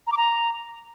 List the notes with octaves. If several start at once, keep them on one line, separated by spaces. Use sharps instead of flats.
A#5
D6
A#5